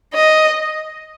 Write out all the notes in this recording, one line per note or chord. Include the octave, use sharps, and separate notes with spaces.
D#5